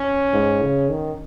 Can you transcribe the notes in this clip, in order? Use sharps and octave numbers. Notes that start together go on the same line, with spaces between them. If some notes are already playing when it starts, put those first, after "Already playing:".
Already playing: C#4
G#2
C#3
D#3